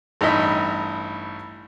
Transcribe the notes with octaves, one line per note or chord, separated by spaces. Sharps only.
A1 G2 D#4 E4 D#5 E5